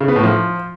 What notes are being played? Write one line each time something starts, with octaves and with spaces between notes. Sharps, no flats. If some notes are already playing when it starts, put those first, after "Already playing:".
C#3
B3
A2
F3